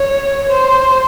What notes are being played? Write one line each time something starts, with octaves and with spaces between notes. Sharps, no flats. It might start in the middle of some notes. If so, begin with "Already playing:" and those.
Already playing: C#5
C5